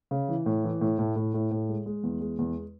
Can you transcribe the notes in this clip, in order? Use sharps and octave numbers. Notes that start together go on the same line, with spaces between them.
C#3
E3
A2
E3
A2
A2
A2
A2
A2
G#3
G#3
E2
G#3
E2